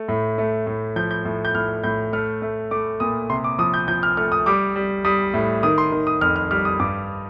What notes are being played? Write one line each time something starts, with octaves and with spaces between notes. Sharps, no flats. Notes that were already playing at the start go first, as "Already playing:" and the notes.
Already playing: A3
A2
A3
A2
F3 G6
G6
A2
G6
A2 F6
A2 G6
A3 F6
A3
A3 D6
A#2 D#6
C3 C6
D6
F3 D#6
G6
F3 G6
F6
A3 F6
D#6
G3 D6
G3
G3 D#6
A2
D#3 D#6
C6
D#3
D#6
F2 F6
F6
G3 F6
D#6
G2 D6